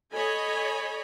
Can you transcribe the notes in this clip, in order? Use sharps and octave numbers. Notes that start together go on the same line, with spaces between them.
A4 C#5 D#5 G#5 B5